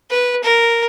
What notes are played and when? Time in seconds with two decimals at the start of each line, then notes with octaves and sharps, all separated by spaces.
0.10 B4
0.44 A#4